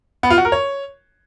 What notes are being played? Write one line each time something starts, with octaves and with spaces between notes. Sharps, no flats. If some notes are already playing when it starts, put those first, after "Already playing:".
B3
F4
F#4
A#4
C#5